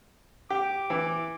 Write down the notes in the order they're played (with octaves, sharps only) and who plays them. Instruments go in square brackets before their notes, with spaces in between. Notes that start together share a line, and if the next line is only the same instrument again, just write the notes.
[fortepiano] G4 [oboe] D6
[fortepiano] E3